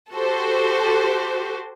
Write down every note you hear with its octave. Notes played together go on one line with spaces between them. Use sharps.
F#4 G4 A4 C5